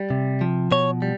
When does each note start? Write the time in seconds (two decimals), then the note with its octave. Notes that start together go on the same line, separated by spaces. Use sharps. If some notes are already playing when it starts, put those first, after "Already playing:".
Already playing: G3
0.10 C3
0.41 F3
0.71 B2 C#5
1.02 G3